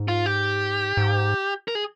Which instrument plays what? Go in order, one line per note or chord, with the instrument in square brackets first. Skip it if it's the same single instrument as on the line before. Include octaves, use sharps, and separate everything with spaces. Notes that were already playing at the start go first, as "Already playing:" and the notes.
Already playing: [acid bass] G#2
[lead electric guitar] F4
G4
[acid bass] G#2
[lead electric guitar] A#4
G#4